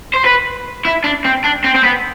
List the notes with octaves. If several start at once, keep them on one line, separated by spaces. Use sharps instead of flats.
C5
B4
E4
D4
C4
D4
C4
C4
B3